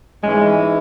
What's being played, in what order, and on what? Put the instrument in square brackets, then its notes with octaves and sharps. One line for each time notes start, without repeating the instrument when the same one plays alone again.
[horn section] G#2 E3 G#3 C#4